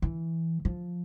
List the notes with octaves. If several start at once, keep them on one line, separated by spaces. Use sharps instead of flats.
E3
F3